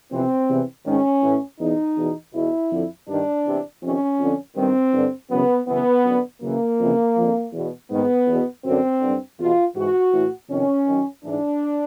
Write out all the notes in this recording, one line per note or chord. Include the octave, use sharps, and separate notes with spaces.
F2 C3 E3 C4
E2 C3 E3
G#2 D#3 C#4
A2 E3
E2 B2 D#4
E2 B2
E2 B2 E4
F2 D3
G2 D#3 D4
E2 C3 E3
F2 C3 D#3 C#4
F2 D3
G2 D#3 C4
G2 D3
F#2 C#3 E3 B3
F#2 C#3 E3 B3
F#2 D3
F#2 C#3 E3 A#3
F2 C#3 E3
F2 D3
E2 B2
G#2 D#3 B3
E2
B2
F#2 D3 C4
G2 D3
E2 B2 F4
G#2 E3 F#4
A2 E3
F2 C3 D#3 C#4
F#2 D#3
G#2 E3 D4